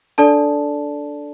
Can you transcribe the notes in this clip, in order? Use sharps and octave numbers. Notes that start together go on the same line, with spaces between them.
D4 A4 D5 A5